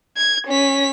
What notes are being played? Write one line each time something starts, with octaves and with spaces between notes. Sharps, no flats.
G#6
C#4 B6